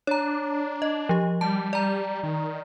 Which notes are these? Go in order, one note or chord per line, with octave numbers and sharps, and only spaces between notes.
D4 C#5 A#5
D#5
F3 G4
G3 A5
G3 D5 A#5
D#3